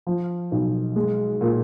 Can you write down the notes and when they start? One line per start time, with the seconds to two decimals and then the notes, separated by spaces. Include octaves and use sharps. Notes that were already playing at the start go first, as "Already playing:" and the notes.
0.07 F3
0.52 B1
0.96 G#3
1.41 A#2